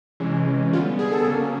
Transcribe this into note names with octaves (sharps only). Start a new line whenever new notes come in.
C3 E3 G#3 C#4
D3 G3 B3 F4
G#4
A4
C#3 F#3 A#3 C#4 A4